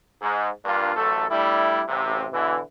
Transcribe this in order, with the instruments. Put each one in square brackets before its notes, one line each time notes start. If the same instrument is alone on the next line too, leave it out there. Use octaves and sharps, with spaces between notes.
[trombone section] G#2
G2 A#2 A#3 D4 F4
A1 F#2 A3 A4
G3 A3 D4 E4
A1 C3
B2 D3 E3